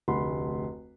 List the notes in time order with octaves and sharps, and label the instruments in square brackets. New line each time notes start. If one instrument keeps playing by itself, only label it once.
[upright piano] F1 D2 F#5 B5 C6